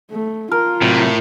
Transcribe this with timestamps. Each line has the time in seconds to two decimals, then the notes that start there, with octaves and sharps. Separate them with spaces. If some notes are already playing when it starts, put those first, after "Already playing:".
0.11 A3
0.52 F4 A#4
0.82 A2 C3 F#3